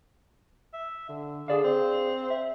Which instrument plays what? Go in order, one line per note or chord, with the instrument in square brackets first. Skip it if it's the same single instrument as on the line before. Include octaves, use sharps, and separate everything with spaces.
[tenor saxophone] E5
D3
[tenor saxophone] D3 [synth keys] G#4 D5 F5
[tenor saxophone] C4
[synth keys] E5